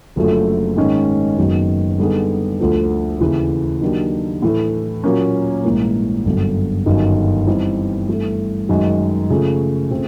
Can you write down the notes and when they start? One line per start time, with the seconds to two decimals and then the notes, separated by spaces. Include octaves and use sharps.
0.16 F#1 F#2 D3 F3 A3
0.77 G#2 D#3 G#3 C#4
1.37 F#1 F#2 D#3 F#3 B3
1.99 D3 G3 B3 D#4 G#4
2.60 D2 D3 F3
3.21 D#2 C#3 E3
3.81 D#3 F#3 A#3 D4 G4
4.42 A2 E3 A3
5.04 A#2 F#3 A#3 C#4
5.64 A#1 G#2 E3 G3 A#3
6.25 G1 F#2 D3 G3
6.86 G1 F#2 D#3
7.47 E3 G3 C4 D#4
8.08 G2 E3 A3
8.69 F#2 D#3 G#3
9.30 C#3 F3 A3
9.91 C#3 F3 A3 C4